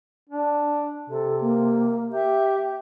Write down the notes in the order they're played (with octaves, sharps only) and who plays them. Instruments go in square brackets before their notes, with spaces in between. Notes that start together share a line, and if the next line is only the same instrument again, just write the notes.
[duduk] D4
[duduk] C3 [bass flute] A4
[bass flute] A#3
[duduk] G4 [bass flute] E5